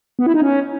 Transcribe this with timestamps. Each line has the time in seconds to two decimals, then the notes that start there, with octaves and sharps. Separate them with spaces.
0.19 B3
0.26 E4
0.34 D#4
0.42 C#4